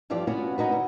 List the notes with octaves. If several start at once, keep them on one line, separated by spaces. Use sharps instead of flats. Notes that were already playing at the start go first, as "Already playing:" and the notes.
G2 E3 F3 F4 G4 D5
B3 C#4 F4 F#4
C#4 D#4 F#4 B4
D3